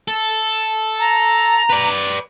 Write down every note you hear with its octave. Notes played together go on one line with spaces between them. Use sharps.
A4
A#5
B4 D5